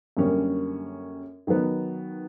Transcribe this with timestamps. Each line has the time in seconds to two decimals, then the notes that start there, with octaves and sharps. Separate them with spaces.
0.17 F#2 D3 G3 A#3 C#4
1.47 D#3 F#3 B3 D#4